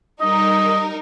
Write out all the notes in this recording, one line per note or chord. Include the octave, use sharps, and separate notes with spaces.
G3 D#4 A#4 D#5